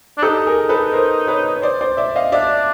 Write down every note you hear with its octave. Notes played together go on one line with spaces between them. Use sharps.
D4
D#4 G4 A4
G#4 A#4
A4 B4
A#4 C5
B4 C#5
C#5
C5 D5
C5 D5
D5 E5
D#5 F5
D4 D5 E5